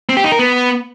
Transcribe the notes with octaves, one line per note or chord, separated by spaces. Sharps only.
C4
G4
D#4
A#4
B3